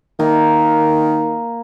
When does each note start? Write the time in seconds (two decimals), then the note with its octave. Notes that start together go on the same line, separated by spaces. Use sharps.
0.19 D#3 A#3